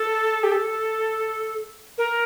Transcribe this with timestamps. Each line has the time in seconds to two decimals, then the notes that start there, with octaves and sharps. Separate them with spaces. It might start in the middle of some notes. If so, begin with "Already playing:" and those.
Already playing: A4
0.43 G4
0.51 A4
1.98 A#4